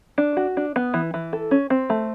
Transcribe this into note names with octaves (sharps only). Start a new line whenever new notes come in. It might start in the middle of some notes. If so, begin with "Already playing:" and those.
D4
F#4
D4
B3
E3
E3
A4
C#4
C4
A3